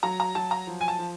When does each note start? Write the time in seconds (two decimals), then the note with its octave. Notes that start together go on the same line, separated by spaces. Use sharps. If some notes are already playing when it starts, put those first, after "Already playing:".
0.03 F#3 A#5
0.20 A#5
0.35 F#3 A5
0.51 A#5
0.67 F3
0.81 G#5
0.88 A5
0.99 F3